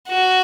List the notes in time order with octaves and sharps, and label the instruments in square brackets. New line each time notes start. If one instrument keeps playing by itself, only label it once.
[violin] F#4